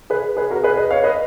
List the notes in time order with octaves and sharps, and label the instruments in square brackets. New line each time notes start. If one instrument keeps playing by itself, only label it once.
[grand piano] G#4 B4
G#4 B4
F#4 A#4
G#4 B4
B4 D#5
C#5 F5
B4 D#5